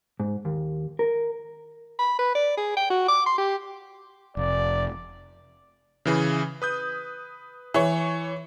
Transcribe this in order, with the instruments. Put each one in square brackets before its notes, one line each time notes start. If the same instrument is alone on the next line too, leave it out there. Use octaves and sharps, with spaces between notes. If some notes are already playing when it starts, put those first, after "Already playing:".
[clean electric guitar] G#2
D#2
A#4
[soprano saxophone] B5
B4
D5
G#4
G5
F#4
D6
C6
G4
[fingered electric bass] F1 [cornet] D5
[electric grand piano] C#3 E3 G#4
B4 D#6 G6
[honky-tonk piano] E3 C#5